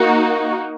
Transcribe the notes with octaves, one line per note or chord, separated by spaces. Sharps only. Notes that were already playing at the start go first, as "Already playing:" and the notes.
Already playing: A#3 D#4 F#4